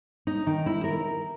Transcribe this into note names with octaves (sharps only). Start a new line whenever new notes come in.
D#4
D#3
E4
A#4